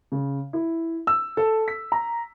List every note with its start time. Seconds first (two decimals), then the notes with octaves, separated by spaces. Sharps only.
0.12 C#3
0.53 E4
1.07 E6
1.37 A4
1.68 B6
1.92 A#5